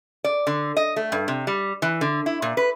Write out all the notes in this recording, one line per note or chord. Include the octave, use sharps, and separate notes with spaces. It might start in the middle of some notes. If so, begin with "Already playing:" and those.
D5
D3
D#5
A3
G2
C3
G3
E3
D3
E4
A#2
B4